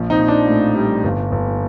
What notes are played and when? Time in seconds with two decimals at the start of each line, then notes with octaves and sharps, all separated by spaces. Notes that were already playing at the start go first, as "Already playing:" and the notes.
Already playing: A#1 F3
0.10 C4 D#4
0.19 A#1
0.28 D4
0.47 A2
0.75 G3
1.04 G1
1.32 G1